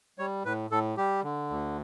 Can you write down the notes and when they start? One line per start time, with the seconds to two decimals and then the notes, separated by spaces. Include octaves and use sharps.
0.18 G3 C#5
0.45 A2 B4
0.71 A2 A4
0.97 G3 G4
1.23 D3
1.50 D2